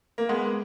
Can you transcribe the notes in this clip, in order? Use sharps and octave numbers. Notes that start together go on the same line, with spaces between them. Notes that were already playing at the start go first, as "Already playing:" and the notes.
A#3
G#3 B3